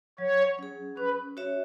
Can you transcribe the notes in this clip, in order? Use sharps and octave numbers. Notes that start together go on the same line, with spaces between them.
F#3 C#5
C#4 G#4
C#4 B4
F#4 C#5 E5